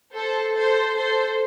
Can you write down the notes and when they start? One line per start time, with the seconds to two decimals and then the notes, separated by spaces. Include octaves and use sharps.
0.15 A4 C5
0.55 A4 C5
0.96 A4 C5